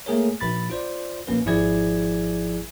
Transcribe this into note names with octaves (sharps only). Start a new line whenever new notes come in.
A3 A#3 G#4 A#4 C#5
A#1 B5 A6
F4 C5 D5
A#1 A#3 C#4 B4
G#1 F3 E4 G#4 D5 G#6